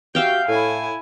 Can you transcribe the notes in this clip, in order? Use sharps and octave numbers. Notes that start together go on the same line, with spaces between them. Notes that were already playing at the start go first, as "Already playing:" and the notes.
F#4 G4 E5 F5 G5 G6
A2 E4 G#5